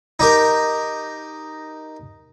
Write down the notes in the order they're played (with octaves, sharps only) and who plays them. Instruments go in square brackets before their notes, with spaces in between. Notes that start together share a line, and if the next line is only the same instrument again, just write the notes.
[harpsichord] D#4 G4 A#4